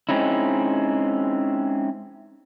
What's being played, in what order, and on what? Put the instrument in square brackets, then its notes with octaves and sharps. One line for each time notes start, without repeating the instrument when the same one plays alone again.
[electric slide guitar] G#3 C4 C#4 D#4 E4